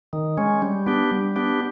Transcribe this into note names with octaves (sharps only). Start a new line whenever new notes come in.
D#3
G#3 C#4
G3
B3 D4 G4
G3
B3 D4 G4